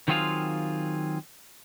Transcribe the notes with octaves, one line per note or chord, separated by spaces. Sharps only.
D#3 F#3 C4 F4 G#4 F5